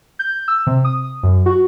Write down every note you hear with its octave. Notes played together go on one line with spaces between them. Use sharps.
G6
E6
C3
D#6
F#2
F#4